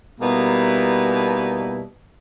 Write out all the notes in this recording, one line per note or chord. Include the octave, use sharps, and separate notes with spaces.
B2 G3 A#3 B3 D#4 E4